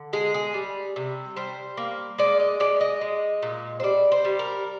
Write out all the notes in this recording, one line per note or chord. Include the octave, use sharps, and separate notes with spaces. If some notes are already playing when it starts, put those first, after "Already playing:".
Already playing: D3
G#3 G#4
G#4
G3
C3
G3 C5
A#3
G#3 D5
D#5
G#3 D5
D#5
G#3
A#2
C5
G3 D5
C5
G3
A#4